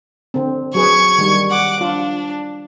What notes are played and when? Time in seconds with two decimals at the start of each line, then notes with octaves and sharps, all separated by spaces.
0.34 D3 C4
0.75 F#3 G#4 B4 C#6 G#6
1.18 D#3 G3
1.50 F#5 D6
1.81 D4 F4